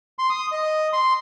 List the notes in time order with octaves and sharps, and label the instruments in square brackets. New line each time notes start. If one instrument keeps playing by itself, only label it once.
[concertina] C6
D#6
D#5
C6